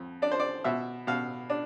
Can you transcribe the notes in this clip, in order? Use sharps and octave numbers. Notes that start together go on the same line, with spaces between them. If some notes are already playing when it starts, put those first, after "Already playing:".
Already playing: F2
D4 D5
C5
D5
B2 E5
B2 F5
D4